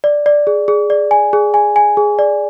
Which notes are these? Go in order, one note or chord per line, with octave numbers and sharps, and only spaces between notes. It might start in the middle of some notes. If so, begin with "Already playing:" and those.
D5
D5
G#4
G#4
D5
G#5
G#4
G#5
G#5
G#4
D5